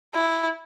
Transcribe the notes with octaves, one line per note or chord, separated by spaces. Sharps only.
E4